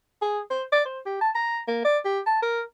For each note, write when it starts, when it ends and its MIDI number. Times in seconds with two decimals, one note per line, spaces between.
0.22 0.40 68
0.50 0.64 72
0.72 0.84 74
0.85 1.00 72
1.06 1.19 67
1.21 1.30 81
1.35 1.59 82
1.68 1.83 58
1.85 1.99 74
2.05 2.20 67
2.26 2.39 81
2.42 2.62 70